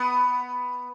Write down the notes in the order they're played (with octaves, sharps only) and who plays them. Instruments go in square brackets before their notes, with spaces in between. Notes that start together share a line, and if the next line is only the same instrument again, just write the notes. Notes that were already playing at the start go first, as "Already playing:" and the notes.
Already playing: [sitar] B3